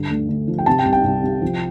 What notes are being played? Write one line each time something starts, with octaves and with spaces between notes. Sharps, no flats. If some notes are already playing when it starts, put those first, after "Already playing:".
Already playing: G2 D3
D2
D2
F3
G5
C3 A5
G5
C2
G5
C2
C2
F3